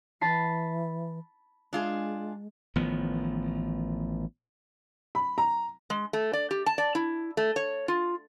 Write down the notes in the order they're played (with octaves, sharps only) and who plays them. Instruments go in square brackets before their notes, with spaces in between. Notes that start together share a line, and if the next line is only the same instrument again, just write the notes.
[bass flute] E3 [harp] A5 B5 C7
[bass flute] G#3 [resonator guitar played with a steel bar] D4 F4 G#4
[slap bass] A1 D#3 F3 B3
[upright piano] B5
A#5
[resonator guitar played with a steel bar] G#3
A3
D5
G4
A5
D5
E4
A3
C#5
F4